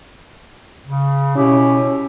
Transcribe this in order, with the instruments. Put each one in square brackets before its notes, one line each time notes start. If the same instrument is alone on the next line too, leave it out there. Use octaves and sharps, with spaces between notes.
[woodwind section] C#3
[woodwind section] B2 E4 G4 [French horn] C#4